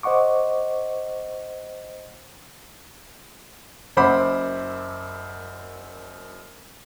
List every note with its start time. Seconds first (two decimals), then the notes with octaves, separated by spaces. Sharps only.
0.03 C5 D#5 F#5 C#6 D6
3.97 F#1 F#2 C5 F#5 B5 D6